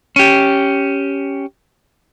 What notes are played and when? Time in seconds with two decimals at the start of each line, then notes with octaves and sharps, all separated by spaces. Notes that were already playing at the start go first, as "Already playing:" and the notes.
0.16 C#4 G4